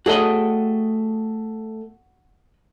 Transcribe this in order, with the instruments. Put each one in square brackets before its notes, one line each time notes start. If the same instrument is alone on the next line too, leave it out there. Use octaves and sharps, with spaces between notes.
[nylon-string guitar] A3 G#4 G5 [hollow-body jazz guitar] F#4 C#5 D#5